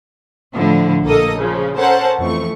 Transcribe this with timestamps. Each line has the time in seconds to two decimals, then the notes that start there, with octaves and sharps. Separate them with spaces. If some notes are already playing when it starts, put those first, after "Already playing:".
0.55 A2 D3 F3 E4
1.04 A#1 A#3 A4 A#4 D#5 D#6
1.35 C#3 F3
1.76 C#4 A4 A#4 C5 F#5 A5
2.19 F2 E3 F3 A3 C#6